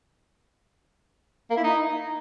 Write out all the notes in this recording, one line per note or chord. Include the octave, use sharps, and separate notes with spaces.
A#3
E4
D#4